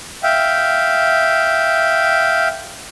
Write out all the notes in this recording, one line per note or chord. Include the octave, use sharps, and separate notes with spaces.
E5 F5 G5